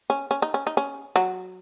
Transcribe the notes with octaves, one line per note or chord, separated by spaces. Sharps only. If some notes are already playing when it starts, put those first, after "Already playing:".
C#4
C#4
D#4
C#4
D#4
C#4
F#3